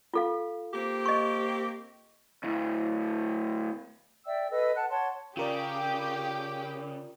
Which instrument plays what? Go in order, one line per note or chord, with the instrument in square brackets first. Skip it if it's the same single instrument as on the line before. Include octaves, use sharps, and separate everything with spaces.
[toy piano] F4 A4 F5
[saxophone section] A#3 C4 G4
[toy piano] D#5 C#6
[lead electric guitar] D2 A2
[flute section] D5 E5 G5 E6
A4 B4 D#5 E6
F#5 A5 F#6
C#5 F#5 A5 C6
[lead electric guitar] C#3 [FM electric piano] F4 A#4 D5 [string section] G4